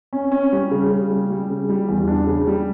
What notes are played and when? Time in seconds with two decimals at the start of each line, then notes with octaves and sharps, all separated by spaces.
0.13 C#4
0.32 C#4
0.52 G3
0.71 C#3
0.91 C#3
1.10 G3
1.30 G3
1.50 C#3
1.69 G3
1.88 E2
2.08 D4
2.27 C#3
2.47 G3